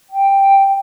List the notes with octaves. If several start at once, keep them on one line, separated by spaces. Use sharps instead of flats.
G5